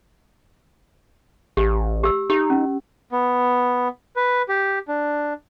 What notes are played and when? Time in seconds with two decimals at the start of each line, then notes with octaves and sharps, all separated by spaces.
1.57 A1 G4
2.03 G4 E6
2.30 D#4 G4
2.50 C#4
3.12 B3
4.16 B4
4.49 G4
4.88 D4